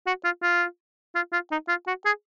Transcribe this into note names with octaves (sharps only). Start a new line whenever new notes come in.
F#4
F4
F4
F4
F4
D#4
F4
F#4
G#4